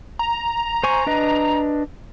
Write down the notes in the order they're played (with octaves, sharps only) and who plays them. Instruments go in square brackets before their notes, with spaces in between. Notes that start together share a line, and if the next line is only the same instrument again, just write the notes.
[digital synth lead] A#5
[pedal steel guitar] C5 G#5 C#6
D4 B4 D#5